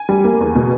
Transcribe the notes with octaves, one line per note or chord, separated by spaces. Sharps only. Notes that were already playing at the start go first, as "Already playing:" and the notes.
Already playing: G#5
G3
A#3
E2
B2